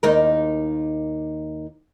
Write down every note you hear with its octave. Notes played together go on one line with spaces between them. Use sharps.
D#2 D#4 A#4